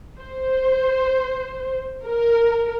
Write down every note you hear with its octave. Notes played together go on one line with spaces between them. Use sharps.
C5
A#4